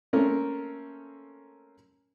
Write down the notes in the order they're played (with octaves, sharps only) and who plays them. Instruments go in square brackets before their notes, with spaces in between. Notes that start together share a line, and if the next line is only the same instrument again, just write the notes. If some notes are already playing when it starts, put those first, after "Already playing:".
[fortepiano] A3 A#3 C4 C#4 A4 A#4